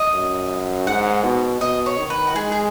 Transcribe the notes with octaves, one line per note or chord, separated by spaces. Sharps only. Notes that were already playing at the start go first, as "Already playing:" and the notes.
Already playing: D#5
F#2
G#2 F#5
B2
B2 D#5
C#5
D#3
B4
F#4
G#3 G#4
G#4